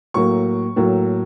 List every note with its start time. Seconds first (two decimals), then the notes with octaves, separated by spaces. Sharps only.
0.14 A2 F#3 A#3 C#6
0.76 A2 F#3 A#3